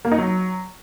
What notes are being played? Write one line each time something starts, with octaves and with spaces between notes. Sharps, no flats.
A#3
D#4
F#3